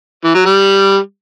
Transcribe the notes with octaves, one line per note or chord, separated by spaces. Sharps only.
E3
F#3
G3